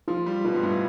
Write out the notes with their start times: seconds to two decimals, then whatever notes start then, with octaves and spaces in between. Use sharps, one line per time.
0.08 F3 F4
0.26 G3
0.45 B2 F4
0.54 G2
0.63 A2